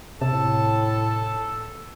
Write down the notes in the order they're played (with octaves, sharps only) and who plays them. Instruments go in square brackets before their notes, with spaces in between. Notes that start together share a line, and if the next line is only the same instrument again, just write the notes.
[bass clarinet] A2 [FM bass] C3 [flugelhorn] A4 [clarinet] A5